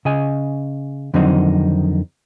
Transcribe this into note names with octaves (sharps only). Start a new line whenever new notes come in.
C#3 D#5 G#5
F2 D3 D#3 F#3 C4 D#4